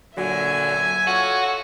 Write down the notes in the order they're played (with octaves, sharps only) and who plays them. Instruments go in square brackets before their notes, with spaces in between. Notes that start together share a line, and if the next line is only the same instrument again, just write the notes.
[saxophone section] A#2 D3 F#3 [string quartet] E5 G#5
[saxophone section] F4 A4 C#5 [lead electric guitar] F#4